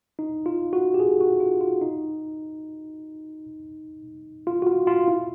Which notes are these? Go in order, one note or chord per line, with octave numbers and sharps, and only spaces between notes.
D#4
F4
F#4
G4
G#4
F#4
F4
F4
D#4
F4
F#4
F4
F4
E4